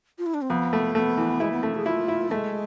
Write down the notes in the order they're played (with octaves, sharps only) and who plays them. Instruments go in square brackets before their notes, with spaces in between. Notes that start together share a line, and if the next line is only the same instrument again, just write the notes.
[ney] F4
E4
D4
C4
[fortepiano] F2 [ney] B3
[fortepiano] A3
[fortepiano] A3 [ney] B3
[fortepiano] E3
[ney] G#3 [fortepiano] E4
[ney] B3
[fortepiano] A3 [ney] C4
[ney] G#4
[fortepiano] E4 [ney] F4
[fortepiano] E4
[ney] G#3 [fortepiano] A3